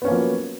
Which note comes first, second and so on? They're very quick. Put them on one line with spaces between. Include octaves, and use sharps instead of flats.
B3 C#4 A#3 F3 F#3